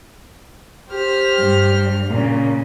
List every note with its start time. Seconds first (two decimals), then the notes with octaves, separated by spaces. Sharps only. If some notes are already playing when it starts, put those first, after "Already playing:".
0.89 G4 C5 F6
1.38 G2
2.10 A#2 C#3